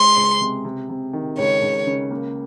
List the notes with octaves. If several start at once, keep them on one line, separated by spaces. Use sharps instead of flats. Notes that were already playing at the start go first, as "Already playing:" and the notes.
Already playing: G#3 C6
C#2
C3
C3
C3
D#3
C#2 C#5
C#2
C#3
A#3